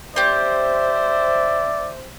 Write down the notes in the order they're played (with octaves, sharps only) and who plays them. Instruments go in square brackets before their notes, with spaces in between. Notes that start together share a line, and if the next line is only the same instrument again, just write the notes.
[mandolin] C4 G4 [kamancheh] C5 [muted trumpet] D5 [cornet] E5